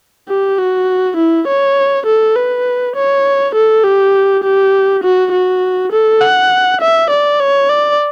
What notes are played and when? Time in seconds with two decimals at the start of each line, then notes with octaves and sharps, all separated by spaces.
0.29 G4
0.58 F#4
1.17 E4
1.48 C#5
2.06 A4
2.36 B4
2.96 C#5
3.55 A4
3.84 G4
4.44 G4
5.03 F#4
5.32 F#4
5.92 A4
6.22 F#5
6.81 E5
7.10 D5
7.40 C#5
7.69 D5